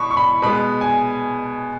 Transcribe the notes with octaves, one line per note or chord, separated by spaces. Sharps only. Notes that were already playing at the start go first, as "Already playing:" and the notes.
Already playing: B2 B5 C#6
C#6
B5
B2 G#3 B3 B5
G#5